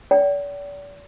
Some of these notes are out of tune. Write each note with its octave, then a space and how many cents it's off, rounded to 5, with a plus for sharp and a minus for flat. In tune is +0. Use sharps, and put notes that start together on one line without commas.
D5 -40 G5 -35